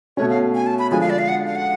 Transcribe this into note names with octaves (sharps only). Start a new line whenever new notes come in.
B2 A3 C#4 C#5
F5
G#5
A5
B5
D3 F3 G#3 G#5
F5
D5
F5
F#5
F5
F#5